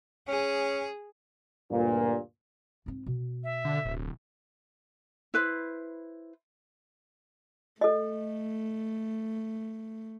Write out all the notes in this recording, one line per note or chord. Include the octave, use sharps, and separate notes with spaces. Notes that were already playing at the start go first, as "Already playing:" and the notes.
C#4 G#4
D2 G2 A#2
G#2 C4
B2
E5
D3
D1
E4 B4 C5
A3 A4 D#5